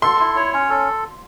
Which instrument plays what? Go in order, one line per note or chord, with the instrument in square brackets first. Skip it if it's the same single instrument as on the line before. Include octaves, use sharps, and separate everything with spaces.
[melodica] A4 [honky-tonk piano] C6
[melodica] E4
C#5
C#4
A4